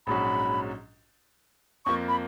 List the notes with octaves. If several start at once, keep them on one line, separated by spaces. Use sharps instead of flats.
A#1 G#2 F#3 C#4 F#4 B5
F2 F3 A#3 C#6
B5